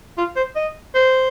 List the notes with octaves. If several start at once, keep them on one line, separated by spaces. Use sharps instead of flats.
F4
C5
D#5
C5